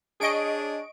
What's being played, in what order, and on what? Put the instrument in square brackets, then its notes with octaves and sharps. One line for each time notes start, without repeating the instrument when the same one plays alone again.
[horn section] D4 G#4 C#5 [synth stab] D#5 C#6 D7